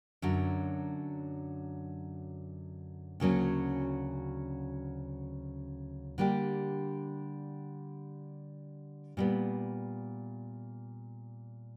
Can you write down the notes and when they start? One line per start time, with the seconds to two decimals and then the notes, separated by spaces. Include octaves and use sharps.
0.22 F#2 D3 F#3
3.20 D2 C#3 F#3 A#3 C#4
6.18 D3 G3 A#3 D4 G4
9.17 A#2 G3 B3